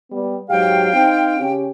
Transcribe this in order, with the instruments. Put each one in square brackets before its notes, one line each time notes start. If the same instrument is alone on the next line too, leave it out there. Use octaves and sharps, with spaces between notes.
[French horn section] G3 B3
[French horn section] G#2 F#3 G4 [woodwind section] F5 G5
[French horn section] C4 D#4
C#3 C#4 G4